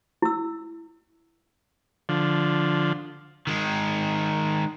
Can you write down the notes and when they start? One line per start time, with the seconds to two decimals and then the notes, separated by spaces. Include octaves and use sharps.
0.22 E4 E6
2.09 D3 F3
3.47 D#3 G#3